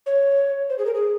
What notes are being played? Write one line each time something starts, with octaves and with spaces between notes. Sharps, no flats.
C#5
C5
G#4
A#4
G#4